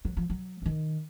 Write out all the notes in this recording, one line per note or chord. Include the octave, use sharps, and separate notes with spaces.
F#3
F3
F#3
E3
D#3